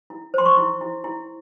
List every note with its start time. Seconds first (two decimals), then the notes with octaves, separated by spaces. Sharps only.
0.10 E4
0.34 C5 C6
0.45 C#6
0.57 E4
0.81 E4
1.04 E4